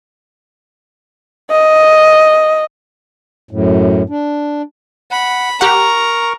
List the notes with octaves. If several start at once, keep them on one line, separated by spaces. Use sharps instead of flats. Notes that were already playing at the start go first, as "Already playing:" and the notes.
D#5
F#2 A2
D4
F#5 B5
G4 A#4 F#5 A#5 C#6